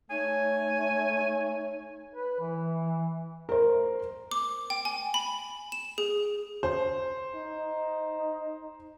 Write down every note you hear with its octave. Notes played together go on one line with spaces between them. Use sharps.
A3 D#4 C#5 G#5
B4
E3
A#4 C5
D6
G5
G#5
B5
E7
G#4
C5
D#4